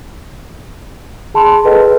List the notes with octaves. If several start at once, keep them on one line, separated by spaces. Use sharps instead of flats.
G#4 A5 B5 C6
G#4 A4 B4 D#5 G5